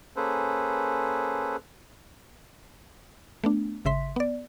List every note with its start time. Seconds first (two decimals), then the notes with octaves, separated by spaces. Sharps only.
0.16 A#3 C#4 G#4 A4 B4 C5
3.44 A3 B3 D4
3.85 G#1 C#3 E5 C6 B6
4.16 B3 D5